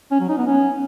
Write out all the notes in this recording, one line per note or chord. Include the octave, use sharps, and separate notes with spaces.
C#4
F#3
D#4
B3
C#4